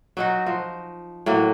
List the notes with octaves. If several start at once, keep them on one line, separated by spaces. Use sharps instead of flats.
F#3 D#4 F#4
F3
A2 F#3 A#3